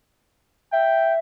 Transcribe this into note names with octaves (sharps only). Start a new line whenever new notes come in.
E5 G5